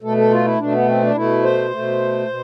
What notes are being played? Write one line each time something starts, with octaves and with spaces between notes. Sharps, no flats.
B2 A3 A4
A4
F4
E4
B2 A3 D4
B3
C4
D4
B2 A3 E4
C5
B2 A3
B2